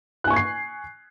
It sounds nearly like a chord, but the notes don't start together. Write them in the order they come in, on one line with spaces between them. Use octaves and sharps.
F#6 G#5 C#6 G#6 C7